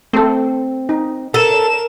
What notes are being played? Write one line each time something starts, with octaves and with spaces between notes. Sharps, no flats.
A3 C4 A4
D#4
A4 A#4 E7